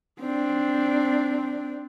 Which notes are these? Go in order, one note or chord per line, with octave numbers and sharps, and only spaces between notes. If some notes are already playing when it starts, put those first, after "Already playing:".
C4 D4